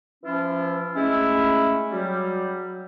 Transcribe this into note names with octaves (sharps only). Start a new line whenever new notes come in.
E3 F3 C#4 E4 F4
G#3 A3 C#4 E4
F#3 G3